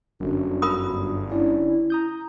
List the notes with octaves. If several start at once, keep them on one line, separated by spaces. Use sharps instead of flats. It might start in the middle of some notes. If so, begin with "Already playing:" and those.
G1 F#2 D3 F#4
A#4 B5 D#6
D3 C#4 E4 D5
A#5 D#6 G6